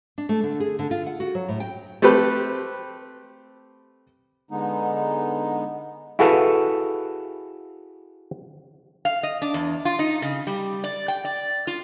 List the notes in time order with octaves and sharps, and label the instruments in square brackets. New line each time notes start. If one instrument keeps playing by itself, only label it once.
[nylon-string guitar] D4
A3
D3
G#4
D3
F4
F#5
F#4
F#3
A2
G5
[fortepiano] A3 C4 G4 A4 B4
[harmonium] D3 G#3 B3 D#4
[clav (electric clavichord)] E4 F#4 G#4 A4 B4 F5
[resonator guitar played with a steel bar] F5
D#5
D4
E2
F4
D#4
C#3
G3
D5
G5
D5
F4